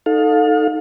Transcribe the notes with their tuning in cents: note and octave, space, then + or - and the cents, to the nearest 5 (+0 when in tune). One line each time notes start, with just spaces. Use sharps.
D#4 +0 A4 +5 F5 +35